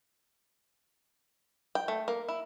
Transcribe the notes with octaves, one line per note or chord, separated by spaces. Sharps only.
G5
A3
A#3
E4